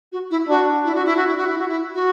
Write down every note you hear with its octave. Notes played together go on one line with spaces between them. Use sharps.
F#4
E4
D4 F#4
E4
F#4
E4
F#4
E4
F#4
E4
F#4
E4
F#4